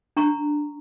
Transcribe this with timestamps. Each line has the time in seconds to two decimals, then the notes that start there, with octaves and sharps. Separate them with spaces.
0.17 D4 A#5 C#6